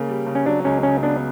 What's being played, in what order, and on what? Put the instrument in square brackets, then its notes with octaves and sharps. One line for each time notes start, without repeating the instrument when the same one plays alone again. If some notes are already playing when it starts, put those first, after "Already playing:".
Already playing: [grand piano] C#3 A#3
G3
C#3
[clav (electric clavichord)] C#4
[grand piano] F#3 [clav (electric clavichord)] D4
[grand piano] C#2 [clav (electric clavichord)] C#4
[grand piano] C#3 [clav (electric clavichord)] C#4
[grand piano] B3 [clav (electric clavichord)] D4